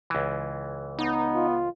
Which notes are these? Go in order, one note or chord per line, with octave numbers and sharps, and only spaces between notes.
C#2 E3
B3 D#4
F4